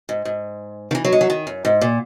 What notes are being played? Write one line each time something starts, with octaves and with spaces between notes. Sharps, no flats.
G#2
G#2
D#3
E3
F#3
G#3
F#3
D#3
F#2
G#2
A#2